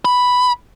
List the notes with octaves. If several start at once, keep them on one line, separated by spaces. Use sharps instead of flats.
B5